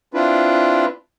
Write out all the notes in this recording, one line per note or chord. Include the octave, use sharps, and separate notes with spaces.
C4 D4 E4 F4 B4